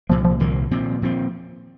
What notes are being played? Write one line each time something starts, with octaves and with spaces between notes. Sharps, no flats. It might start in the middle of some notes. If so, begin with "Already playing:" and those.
C2 A#2 F3 A#3
F3
C2 A#2 D#3 A#3
A#2 F3 C4
A#2 F3 C4